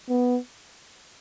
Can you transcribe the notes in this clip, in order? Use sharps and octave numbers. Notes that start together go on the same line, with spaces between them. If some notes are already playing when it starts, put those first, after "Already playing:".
B3